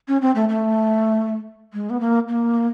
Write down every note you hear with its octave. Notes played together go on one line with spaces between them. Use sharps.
C#4
C4
A3
A3
G#3
B3
A#3
A#3